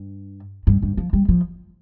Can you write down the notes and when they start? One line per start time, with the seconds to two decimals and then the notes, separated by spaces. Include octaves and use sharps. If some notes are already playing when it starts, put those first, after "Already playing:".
Already playing: G2
0.67 G2
0.82 G2
0.97 F3
1.13 G3
1.28 F3